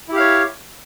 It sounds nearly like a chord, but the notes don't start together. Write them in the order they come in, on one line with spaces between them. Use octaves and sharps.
E4 G4 F5 C#5